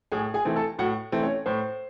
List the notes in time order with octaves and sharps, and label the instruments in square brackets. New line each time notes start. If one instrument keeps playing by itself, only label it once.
[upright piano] A2 [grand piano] G#4 G#5
[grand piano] G#4 G#5
[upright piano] E3 A3 C4
[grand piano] A4 A5
[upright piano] A2 [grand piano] F#4 F#5
[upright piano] E3 A3 C4
[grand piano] C#4 C#5
[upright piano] A2 [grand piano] C5